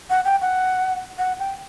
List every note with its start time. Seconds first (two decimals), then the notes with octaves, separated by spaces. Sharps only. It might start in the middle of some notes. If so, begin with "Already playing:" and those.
0.10 F#5
0.25 G5
0.41 F#5
1.18 F#5
1.39 G5